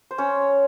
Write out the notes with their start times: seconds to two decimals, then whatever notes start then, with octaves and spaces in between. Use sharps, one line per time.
0.11 C5
0.18 C#4 C#5